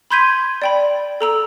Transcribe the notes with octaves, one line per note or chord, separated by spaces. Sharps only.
B5 C6 G6 G#6 B6 D#7
D5 G5 B5
A4 A#5 E6